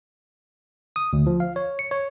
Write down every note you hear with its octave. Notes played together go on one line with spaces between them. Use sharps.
D#6
D2
F3
F5
C#5
C#7
C#5